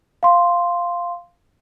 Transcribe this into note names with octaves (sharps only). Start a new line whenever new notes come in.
F5 C6